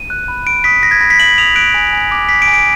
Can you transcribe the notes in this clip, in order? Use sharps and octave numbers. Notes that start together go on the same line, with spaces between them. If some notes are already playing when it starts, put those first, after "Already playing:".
Already playing: D#7
F#6
B5
B5 D7
D#6 B6
F#6 A#6
G#6
B5 A#6
B6
B5 F#7
D#6 F7
F#6 D7
G#5
G#5
D6
F#6 B6
D7
G#5
D7